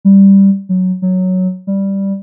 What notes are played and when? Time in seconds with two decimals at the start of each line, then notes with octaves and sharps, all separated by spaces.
0.05 G3
0.69 F#3
1.02 F#3
1.67 G3